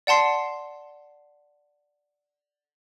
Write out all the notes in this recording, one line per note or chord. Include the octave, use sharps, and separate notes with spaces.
D5 F#5 A5 C6 C7